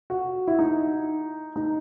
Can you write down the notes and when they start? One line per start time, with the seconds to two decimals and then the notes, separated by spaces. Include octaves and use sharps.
0.10 F#4
0.47 E4
0.59 D#4
1.56 D#4